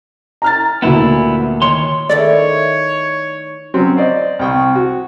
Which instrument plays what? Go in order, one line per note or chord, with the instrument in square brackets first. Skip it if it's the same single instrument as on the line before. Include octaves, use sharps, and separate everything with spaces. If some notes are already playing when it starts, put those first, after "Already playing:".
[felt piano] A#5 F6 A6
[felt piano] D2 A#2 [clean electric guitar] B3 E4
[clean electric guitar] D#3 C#5 C6
[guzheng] D#3 A3 E4 [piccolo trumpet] C#5 [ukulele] D5
[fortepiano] F#3 C4 C#4
C5 D5 D#5
C2 G5 C#6
F#4